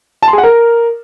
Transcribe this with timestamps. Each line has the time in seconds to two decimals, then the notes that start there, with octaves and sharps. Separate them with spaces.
0.22 A5
0.28 C6
0.33 G#4
0.38 F#5
0.43 A#4